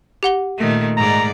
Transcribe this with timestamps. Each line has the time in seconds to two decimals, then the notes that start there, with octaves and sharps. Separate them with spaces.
0.23 G4 F#5 G7
0.57 A#2 D#3 A3
0.97 G#2 D5 A#5